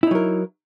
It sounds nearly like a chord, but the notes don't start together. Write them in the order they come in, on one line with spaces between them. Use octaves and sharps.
E4 D#4 F#3 A#4